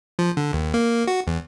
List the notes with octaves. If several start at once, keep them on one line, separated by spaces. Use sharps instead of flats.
F3
D3
D#2
A#3
F#4
E2